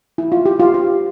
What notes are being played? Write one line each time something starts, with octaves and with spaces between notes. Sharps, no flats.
E4
F4
G4
F4
G4